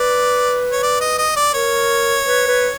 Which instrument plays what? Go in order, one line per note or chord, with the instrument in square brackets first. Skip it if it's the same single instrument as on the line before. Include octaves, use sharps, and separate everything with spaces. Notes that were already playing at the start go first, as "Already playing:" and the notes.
Already playing: [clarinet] B4 [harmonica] D5
[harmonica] C#5
D5
D#5
D#5
D5
[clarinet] A#4 [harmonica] C#5
[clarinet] B4
B4